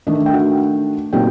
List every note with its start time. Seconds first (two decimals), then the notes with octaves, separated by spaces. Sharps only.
0.07 D#3 A3 D4 D#4 D#5
0.26 G5
0.33 F#4 F#5
1.13 A#2 F#3 C4 D#4 G4 G5